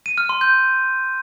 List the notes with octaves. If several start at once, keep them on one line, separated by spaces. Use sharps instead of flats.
D#7
F6
C6
G6